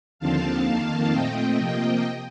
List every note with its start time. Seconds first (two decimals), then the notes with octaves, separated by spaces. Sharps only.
0.19 D#2 D3 F3 C4 F5 A5
0.65 F2 D#3 A#3
1.10 A#2 A3 C4 D#5 G5
1.56 C3 F3 A#3